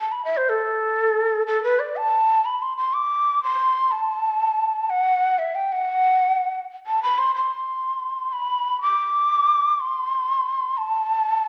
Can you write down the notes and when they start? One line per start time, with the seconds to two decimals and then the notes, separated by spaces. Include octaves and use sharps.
0.01 A5
0.12 B5
0.25 E5
0.37 C5
0.49 A4
1.47 A4
1.63 B4
1.79 D5
1.97 A5
2.45 B5
2.62 C6
2.77 C6
2.94 D6
3.43 C6
3.91 A5
4.90 F#5
5.39 E5
5.55 G5
5.72 F#5
6.87 A5
7.03 B5
7.18 C6
7.35 C6
8.33 B5
8.82 D6
9.80 C6
10.77 A5